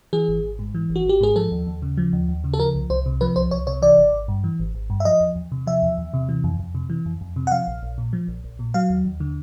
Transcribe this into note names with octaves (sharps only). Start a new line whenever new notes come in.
E3 G#4
G#1
G#1
G#2
E3
G#1
F#4
G#1 G4
G#2 G#4
F3 A4
D#2
D#2
C#3
F3
D#2
D#2
C#3
A4
F3 A#4
C2
C2 C5
C3
F3 B4
C2 C5
C2 C#5
C3 C#5
E3 D5
G#1
G#1
G2
E3
G#1
G#1
G2
E5
F3 D#5
E2
E2
C3
F3 E5
E2
E2
C3
E3
F2
F2
C3
E3
F2
F2
C3
F#5
F3 F5
A#1
A#1
A#2
F3
A#1
A#1
A#2
F#3 F5
D#2
D#2
D3